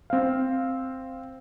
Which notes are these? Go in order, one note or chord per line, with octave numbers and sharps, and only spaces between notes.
C4 F5